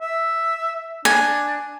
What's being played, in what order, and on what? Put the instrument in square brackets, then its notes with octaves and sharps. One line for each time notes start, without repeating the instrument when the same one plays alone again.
[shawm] E5
[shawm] D4 [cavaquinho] G#5